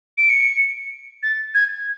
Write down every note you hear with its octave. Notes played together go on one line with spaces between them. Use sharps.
D7
C#7
A6
G#6